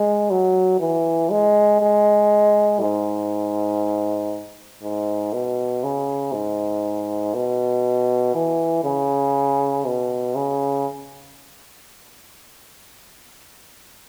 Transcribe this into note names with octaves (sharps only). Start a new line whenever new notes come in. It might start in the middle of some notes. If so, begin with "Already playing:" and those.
Already playing: G#3
F#3
E3
G#3
G#3
G#2
G#2
B2
C#3
G#2
B2
E3
C#3
B2
C#3